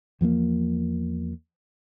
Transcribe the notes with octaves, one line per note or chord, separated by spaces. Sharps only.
E2 F3 G#3 A#3